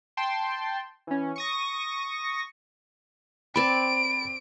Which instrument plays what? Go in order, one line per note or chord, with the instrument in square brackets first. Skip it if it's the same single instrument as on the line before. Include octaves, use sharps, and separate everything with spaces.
[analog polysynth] G5 A5 C6
E3 C#4
C#6 D#6 A#6
[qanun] C4 D5 A5 [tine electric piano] B5 A6 [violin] D7